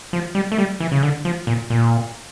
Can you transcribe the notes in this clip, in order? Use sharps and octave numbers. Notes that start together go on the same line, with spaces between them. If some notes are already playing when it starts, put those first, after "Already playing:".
F3
G3
A3
G3
E3
C#3
D3
F3
A#2
A#2